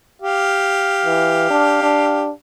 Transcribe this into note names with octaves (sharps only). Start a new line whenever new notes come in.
G4 F5
E3
D4
D4